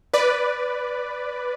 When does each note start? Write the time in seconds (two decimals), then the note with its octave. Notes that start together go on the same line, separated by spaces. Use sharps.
0.14 B4 D5